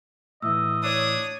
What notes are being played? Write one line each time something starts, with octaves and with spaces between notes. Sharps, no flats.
A2 E3 D#5 E6
D4 C#5 D#6